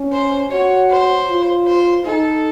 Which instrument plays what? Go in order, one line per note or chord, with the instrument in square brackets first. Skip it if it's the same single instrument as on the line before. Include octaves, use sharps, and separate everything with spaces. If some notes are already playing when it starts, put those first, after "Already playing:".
Already playing: [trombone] C#4
[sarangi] C5
[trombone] F#4 [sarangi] C#5
[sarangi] C5
[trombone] F4
[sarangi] C5
[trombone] D#4 [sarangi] A4